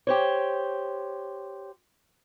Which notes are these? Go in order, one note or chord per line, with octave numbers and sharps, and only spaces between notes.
G4 C5 C#5